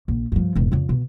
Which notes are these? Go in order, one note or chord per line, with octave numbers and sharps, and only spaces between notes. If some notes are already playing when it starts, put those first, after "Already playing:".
A#1
G2 F3
E1 G#2
F2 C#3
B2